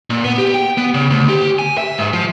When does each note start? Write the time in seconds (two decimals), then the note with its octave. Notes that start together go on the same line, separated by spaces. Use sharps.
0.10 A#2
0.24 B3
0.38 G4
0.54 G5
0.78 B3
0.94 C#3
1.10 D2
1.29 G4
1.59 G#5
1.77 E5
1.98 G#2
2.13 F3